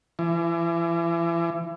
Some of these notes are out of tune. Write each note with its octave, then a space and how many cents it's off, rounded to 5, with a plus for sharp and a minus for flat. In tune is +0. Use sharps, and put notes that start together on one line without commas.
E3 +35